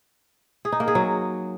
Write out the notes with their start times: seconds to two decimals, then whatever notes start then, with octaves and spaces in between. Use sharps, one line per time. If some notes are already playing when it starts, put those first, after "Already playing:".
0.65 G#4
0.72 D#4
0.80 A#3
0.88 G#4
0.95 F#3